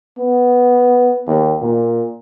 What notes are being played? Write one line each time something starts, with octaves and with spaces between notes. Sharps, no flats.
B3
D#2
A#2